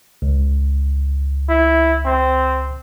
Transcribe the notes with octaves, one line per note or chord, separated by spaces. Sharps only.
C#2
E4
C4